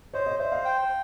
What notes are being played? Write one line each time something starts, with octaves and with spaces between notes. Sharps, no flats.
C5 C#5 D#5
C#5 D#5
C5 D5 E5
D#5 F5
G5